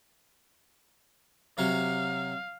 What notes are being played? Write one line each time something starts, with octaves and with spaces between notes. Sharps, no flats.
C3 F#3 F5